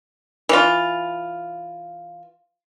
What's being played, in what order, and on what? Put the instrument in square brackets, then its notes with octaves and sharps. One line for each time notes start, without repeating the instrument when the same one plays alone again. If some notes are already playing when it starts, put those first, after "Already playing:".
[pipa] E3 F4